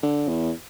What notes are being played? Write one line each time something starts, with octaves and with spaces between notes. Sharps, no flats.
D3
E2